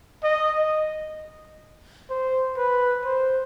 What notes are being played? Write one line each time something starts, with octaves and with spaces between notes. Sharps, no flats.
D#5
C5
B4
C5